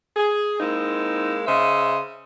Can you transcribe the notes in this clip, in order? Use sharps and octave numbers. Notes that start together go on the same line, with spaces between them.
G#4
G#3 A#3 C4 D#4 E4
C#3 C5 D#5 E5